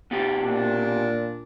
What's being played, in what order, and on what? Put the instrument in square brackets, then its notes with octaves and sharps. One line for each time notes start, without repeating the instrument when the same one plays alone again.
[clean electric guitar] B2 F4 G4
[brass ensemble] A#2 D4